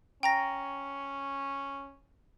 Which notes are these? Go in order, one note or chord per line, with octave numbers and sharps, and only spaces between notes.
C#4 G5 A#5 A#6